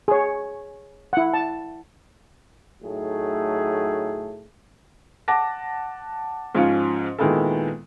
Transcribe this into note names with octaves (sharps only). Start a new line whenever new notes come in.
G#4 C#5
E4 F#5
A5
A2 F#3 A3 D#4 G#4
F#5 A5 D6 A#6
G#2 F3 C#4 F4 F5 C#7
A#2 D#3 G#3 B3 E4 A4